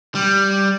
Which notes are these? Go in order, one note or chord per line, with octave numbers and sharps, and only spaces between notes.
G3